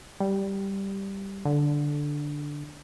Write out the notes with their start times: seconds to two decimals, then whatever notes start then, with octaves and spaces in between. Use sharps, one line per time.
0.20 G3
1.45 D3